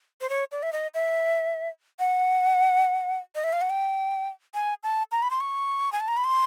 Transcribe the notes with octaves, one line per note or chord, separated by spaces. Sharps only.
C5
C#5
D5
E5
D#5
E5
F#5
D#5
E5
F5
F#5
G5
G#5
A5
A#5
B5
C6
C#6
G#5
A5
A#5
B5
C6